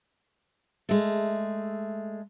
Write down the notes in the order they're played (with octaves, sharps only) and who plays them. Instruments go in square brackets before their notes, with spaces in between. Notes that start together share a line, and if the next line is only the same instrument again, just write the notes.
[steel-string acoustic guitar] G#3 A3